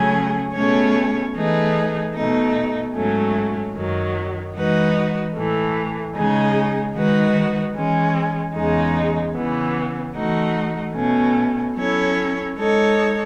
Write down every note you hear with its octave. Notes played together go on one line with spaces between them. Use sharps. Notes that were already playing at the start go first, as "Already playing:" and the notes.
Already playing: C#3 F#3 A3 C#4 G#4
B2 A3 C#4 G#4 C#5
E3 A3 D#4 G#4 B4
B2 A3 D#4
G#2 F#3 A3 C#4
F#2 D#3 F#3
E3 G#3 D#4 F#4 B4
A2 E3 A3
C#3 G#3 D#4 G#4
D#3 G#3 D#4 F#4 B4
E3 G#3 C#4
E2 C#3 G#3 D#4
C#3 E3 B3
E3 A3 D#4 F#4
B2 A3 C#4
F#3 C#4 E4 A4 C#5
G#3 D#4 A4 C#5